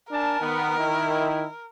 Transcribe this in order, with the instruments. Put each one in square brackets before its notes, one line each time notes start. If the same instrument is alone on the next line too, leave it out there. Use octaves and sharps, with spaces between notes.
[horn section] D4 G#5 A5 [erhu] A#4
[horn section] D#3 B3
D#3 E4